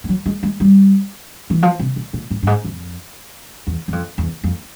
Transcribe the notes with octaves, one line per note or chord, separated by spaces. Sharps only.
G3
F#3
G#3
G#3
G3
E3
F3
C3
B2
A#2
A2
G2
G#2
F2
E2
F#2
F2
E2
F2